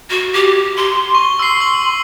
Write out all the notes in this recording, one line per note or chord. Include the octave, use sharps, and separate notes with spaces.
F#4
G4
C6
C#6 G7
C6 E6 C7
E6 F#7